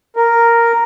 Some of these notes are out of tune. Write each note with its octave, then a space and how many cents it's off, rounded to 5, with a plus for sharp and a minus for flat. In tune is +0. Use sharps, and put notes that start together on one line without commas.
A#4 +0